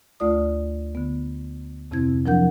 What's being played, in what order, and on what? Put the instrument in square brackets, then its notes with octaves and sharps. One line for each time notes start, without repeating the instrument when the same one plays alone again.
[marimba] D2 A3 F4 D5 D#6
D3 B3
F2 C3 C4 E4 G#6
F3 F#3 D4 A#4 F#5 G6